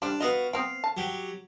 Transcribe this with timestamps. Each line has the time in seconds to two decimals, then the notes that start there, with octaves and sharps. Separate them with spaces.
0.02 G3 D4 G4 C5
0.20 B3 F4 F#4 B4 D#5
0.53 B3 C4 F5 G5
0.84 A5
0.97 F#3 G4